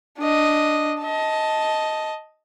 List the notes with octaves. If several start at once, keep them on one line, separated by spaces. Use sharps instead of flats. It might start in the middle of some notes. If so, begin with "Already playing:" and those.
D4 D#5
D#5 A5